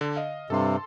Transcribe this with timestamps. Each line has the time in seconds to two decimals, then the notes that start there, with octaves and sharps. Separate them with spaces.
0.01 D3
0.16 D#5 F5
0.50 G2 C3 A4 C6